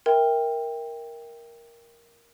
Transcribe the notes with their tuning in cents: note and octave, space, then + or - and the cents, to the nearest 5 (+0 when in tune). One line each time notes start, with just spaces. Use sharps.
A#4 +5 E5 -15 G5 +15